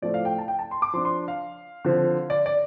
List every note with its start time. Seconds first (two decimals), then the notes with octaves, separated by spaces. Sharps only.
0.02 A2 F3 A3 D5
0.14 F5
0.25 G5
0.38 A5
0.48 G5
0.59 A5
0.71 C6
0.82 D6
0.93 F3 C6
0.97 D4
1.05 C6
1.28 F5
1.85 D3 F3 C4
2.30 D5
2.46 D5